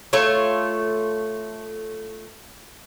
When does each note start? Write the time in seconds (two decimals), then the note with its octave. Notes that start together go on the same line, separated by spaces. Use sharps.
0.13 A3 F4 C#5